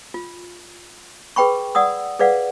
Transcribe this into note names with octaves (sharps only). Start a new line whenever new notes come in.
F4
G#4 B4 G5 B5 C#6
D5 F#5 D#6 E6
G#4 B4 D5 F5 F#5